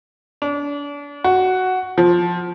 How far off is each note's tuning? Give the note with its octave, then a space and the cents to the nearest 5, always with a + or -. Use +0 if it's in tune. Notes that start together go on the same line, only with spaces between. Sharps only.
D4 -35
F#4 +5
F3 +5